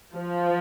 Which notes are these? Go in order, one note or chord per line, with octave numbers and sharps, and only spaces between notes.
F3